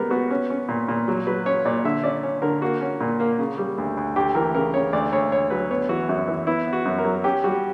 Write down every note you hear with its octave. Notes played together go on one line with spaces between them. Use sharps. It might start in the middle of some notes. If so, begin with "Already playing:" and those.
Already playing: C#2 G3 B3 A#4
B3 F#4
C#4
C#4
A#2
A#2
F#3
F#3 B4
C#4 C#5
A#2 D5
D3 E5
C#4 D5
C#4 C#5
D3 A#4
A#3 F#4
C#4
A#2
A#3
C#3
G3
D2
D2
D2 G4
E3 A#4
C#3 A#4
C#3 C#5
D2 D5
D2 C#5
D2 C#5
F#3 B4
B3 C#5
E3 F#4
F#2 F#4
E3
B3 E4
B3
F#4
F#2
A#4
F#3
C#4 G4
G3 F#4